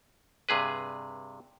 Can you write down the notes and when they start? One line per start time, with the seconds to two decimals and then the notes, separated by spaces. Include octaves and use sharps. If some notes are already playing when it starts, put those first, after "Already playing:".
0.49 G2 C3 G#4 B4